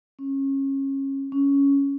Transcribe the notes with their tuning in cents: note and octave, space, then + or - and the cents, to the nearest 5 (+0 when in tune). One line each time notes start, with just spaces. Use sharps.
C#4 -25
C#4 +10